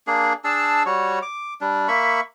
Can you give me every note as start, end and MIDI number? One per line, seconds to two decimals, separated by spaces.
0.07 0.33 58
0.07 0.33 62
0.07 0.33 68
0.44 0.83 62
0.44 0.83 68
0.44 0.83 81
0.44 0.83 88
0.86 1.19 55
0.86 1.19 66
0.86 1.19 73
1.22 1.54 86
1.61 1.88 55
1.61 1.88 62
1.88 2.20 58
1.88 2.20 76
1.88 2.20 83
1.88 2.20 85